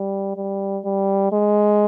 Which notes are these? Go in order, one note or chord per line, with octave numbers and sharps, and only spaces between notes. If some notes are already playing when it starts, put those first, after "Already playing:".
Already playing: G3
G3
G3
G#3